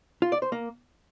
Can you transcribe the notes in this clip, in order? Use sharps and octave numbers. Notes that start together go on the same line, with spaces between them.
F4
D5
C5
A#3